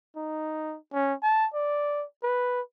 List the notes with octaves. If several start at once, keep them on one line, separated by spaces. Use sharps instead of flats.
D#4
C#4
A5
D5
B4